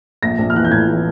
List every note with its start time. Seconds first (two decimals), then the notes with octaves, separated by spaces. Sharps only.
0.23 A#1 A#6
0.39 A#1
0.50 F6
0.56 E3 F#6
0.65 G6
0.71 A2 G#6
0.88 E3